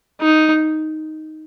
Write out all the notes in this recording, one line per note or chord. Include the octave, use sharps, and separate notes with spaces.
D#4